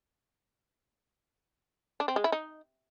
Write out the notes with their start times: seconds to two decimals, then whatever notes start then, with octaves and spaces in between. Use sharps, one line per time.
2.00 D4
2.08 C4
2.16 G#3
2.24 E4
2.32 D#4